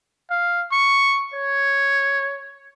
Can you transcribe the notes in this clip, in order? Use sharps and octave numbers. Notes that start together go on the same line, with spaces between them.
F5
C#6
C#5